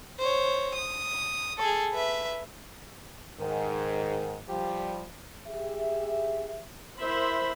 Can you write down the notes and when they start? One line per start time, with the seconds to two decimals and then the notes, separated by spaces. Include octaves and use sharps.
0.19 C5 C#5
0.75 D#6
1.58 G#4 A4
1.93 B4 E5
3.40 G#2 D#3
4.49 F3 G3 G4
5.48 G4 G#4 E5
6.99 E4 A#4 C5 E5 B5